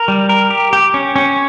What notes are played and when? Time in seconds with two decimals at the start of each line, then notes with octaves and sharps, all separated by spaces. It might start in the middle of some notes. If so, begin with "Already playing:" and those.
Already playing: A#4
0.08 G3
0.29 A#4
0.51 G4
0.73 G4
0.94 C#4
1.16 C#4